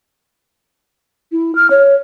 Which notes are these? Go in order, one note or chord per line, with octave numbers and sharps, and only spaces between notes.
E4
F6
C#5